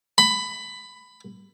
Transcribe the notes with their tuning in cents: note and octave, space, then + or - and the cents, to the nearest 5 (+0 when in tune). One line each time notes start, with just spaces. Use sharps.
B5 +15